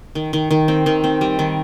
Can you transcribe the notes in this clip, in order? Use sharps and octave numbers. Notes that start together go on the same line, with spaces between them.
D#3
D#3
D#3
C4
D#3
C4
G3
D#3